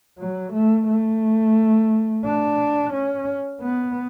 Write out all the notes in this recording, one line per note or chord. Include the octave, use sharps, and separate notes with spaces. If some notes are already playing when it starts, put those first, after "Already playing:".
F#3
A3
A3
D4
C#4
B3